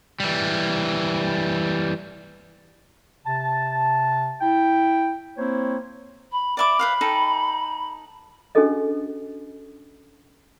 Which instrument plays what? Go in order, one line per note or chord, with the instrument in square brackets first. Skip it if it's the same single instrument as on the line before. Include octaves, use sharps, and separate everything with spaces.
[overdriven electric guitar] E3 G3
[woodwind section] C3 A5
E4 G5
A#3 C4 E4 C5 C#5
[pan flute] B5
[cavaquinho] D5 E5 D6 [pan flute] B5
[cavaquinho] B4 C5 F5
D#4 A4 G5
[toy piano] C#4 D4 F#4 G#4 A4 D#5